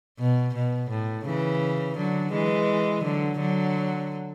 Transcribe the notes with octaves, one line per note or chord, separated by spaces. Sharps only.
B2
B2
A2
C#3 E3
D3 F#3
E3 G#3
D3 F#3
D3 F#3